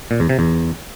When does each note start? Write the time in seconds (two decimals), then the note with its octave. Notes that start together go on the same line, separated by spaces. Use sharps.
0.11 A#2
0.20 E2
0.29 C3
0.39 E2